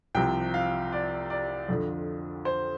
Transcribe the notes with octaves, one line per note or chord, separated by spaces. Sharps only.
C2 C3 F3 G5
F5
D5
D5
F2 D3 F3
C5